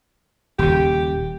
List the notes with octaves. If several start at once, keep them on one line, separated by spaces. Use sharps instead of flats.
D#1 C#3 G4